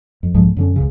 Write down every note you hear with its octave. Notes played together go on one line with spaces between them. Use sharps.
F2
B1 G#2 F3 G#3
F#2 D3 C#4
C#2 C#3